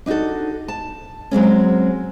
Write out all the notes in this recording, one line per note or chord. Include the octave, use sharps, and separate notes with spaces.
D4 D#4 F4 F#4 A4
A5
F#3 G#3 C4 C#4